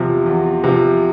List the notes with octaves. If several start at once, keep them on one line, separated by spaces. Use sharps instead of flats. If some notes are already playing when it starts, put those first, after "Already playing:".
Already playing: E2 C3 F3
E2
C3 F3